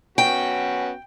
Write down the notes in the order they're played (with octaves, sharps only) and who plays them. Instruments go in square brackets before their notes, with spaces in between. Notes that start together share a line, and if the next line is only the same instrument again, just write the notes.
[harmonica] B3 C#4 F#4 [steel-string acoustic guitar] G5